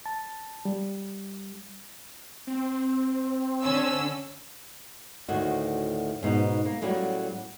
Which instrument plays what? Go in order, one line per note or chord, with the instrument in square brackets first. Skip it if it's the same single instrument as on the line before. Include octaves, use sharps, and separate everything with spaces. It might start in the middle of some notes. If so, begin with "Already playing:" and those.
[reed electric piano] A5
G3
[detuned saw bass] C4
[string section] D3 C#4 E6
[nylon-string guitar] D2 A2 D#3 F#4
G#2 B2 C#4 D#4
A#3
A2 F#3 G3 A#3 C#4 F#4